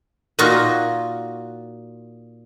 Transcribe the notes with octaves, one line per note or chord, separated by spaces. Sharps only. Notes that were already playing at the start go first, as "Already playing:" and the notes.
A#2 D#4 F4 F#4